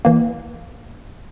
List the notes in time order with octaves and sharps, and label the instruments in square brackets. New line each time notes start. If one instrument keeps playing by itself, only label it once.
[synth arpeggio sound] E3 A#3